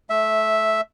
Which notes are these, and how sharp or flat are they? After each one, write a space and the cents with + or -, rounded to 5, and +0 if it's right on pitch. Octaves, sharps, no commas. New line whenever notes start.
A3 -25 E5 -5